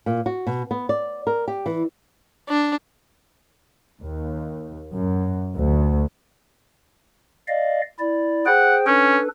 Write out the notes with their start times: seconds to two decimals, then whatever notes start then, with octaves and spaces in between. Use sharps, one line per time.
0.06 A#2
0.26 F#4
0.47 B2
0.71 B3
0.89 D5
1.27 A#4
1.48 G4
1.66 E3
2.49 D4
4.01 D#2
4.92 F#2
5.56 D2
7.48 D5 D#5 F5
7.99 E4 D5
8.46 G#4 C5 F#5 G5
8.87 C#4 D4 A4 B4